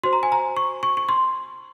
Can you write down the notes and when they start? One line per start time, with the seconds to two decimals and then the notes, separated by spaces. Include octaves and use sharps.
0.03 F#4 C5 C6
0.13 A#5
0.23 G#5
0.32 A#5
0.57 C#6
0.83 C#6
0.97 C#6
1.09 C6